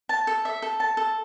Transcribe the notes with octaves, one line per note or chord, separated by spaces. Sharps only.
A5
A4
E5
A4
A5
A4